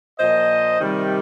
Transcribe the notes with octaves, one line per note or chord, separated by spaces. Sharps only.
A#2 F3 C5 D#5
C3 D#3 G3